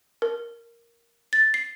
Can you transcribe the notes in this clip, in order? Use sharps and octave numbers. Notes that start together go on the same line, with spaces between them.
A#4
A6
C7